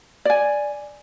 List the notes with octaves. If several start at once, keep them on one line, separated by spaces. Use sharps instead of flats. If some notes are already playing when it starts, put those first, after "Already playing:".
D5 G#5